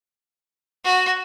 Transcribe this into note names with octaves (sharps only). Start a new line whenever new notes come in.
F#4